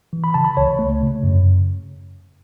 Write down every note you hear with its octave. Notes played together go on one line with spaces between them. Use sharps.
E3
B5
C#3 A5
B5
C#2 C#5
A3
C#3
F#2